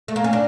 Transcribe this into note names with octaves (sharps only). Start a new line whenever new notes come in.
A3
A#3
C#4
D4